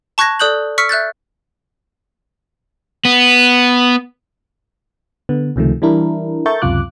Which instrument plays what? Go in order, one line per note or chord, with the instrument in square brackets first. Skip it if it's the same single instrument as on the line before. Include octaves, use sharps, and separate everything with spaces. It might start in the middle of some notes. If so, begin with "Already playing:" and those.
[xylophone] A5 C#6 F#6 G#6 A#6
A4 D5 D#6 F#6 G6 F#7
C#6 E6 F6 B6 C#7
E5 F#6 G6 A6
[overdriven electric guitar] B3
[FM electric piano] D3 B3
C#2 C3 D#3 F3 A3
E3 G3 D4 E4 A#4
A4 A#4 E5 C#6 G6 A6
C#2 F#2 C3 F4 D6 F#6